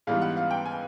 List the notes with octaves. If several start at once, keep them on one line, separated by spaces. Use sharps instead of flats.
G#2 E3 G3 B3 F5
F#5
F5
G5
G#5